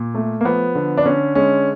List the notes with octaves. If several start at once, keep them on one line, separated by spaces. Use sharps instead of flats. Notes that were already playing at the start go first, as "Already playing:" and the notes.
Already playing: A#2
A3
A#3
F3 B3
D3
D4
D3 C#4
G#3 C#4